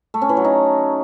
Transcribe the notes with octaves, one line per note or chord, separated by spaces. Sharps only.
A3
C#4
E3
F#3
D#4